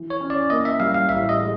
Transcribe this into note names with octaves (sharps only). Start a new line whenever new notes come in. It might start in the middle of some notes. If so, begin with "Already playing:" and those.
Already playing: E3
C#5
C#4
D5
A#3 D#5
E5
G3 F5
F5
A1 E5
D#5
G#3